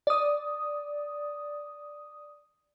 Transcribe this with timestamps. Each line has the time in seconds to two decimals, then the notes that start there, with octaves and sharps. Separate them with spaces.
0.07 D5 D#6